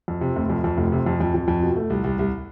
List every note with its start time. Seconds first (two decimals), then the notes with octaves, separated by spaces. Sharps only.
0.08 F2
0.21 C3
0.36 F1
0.50 F2
0.64 F2
0.77 F1
0.92 C3
1.06 F2
1.20 F2
1.35 F2
1.48 F2
1.62 B2
1.76 A3
1.90 C2
2.04 C2
2.19 C2